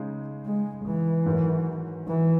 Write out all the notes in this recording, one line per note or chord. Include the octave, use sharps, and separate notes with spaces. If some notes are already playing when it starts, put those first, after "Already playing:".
Already playing: C#3 G#3 D#4 G#4
G#3
E3
G#2 D#3 F#3
E3